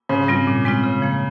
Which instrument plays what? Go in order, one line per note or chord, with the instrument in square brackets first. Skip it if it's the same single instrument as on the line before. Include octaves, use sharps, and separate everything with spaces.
[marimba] G#2 [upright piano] C#3
[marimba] G3 C4 F4
A#2
G#3 C4 F4
C#3
F3 A#3